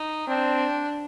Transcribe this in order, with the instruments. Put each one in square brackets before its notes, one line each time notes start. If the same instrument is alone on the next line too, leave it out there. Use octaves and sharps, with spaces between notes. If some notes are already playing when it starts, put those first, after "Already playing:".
Already playing: [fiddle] D#4
[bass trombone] C4 [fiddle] D4